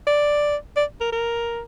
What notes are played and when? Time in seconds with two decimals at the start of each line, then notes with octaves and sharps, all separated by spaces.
0.07 D5
0.77 D5
1.01 A#4
1.13 A#4